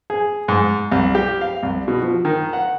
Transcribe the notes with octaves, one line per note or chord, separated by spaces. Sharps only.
G#4
G#2
C2
G4
F5
C2
B2
F3
D#3
F#5